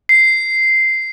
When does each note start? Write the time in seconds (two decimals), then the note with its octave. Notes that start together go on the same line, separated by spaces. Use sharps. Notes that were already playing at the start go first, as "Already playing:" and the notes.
0.09 C7